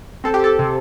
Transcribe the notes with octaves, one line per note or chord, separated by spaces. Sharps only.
C4 A4
G4
A4
C3